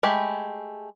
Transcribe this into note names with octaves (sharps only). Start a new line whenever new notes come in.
G#3 A3 G4 B5